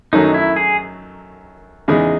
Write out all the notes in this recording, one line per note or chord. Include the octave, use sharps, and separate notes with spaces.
F#2 D#3 F#3 A3 D#4
E4
G#4
E2 C#3 G#3 D#4 G#4